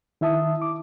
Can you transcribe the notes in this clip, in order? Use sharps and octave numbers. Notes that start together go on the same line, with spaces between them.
D#3 E4 E5 A5 D#6
D6